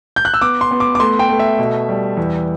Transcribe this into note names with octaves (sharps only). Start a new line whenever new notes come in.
G6
F#6
E6
B3 D6
C6
B3
D6
D6
A3 C6
G5
A3
E5
B2
G3
E2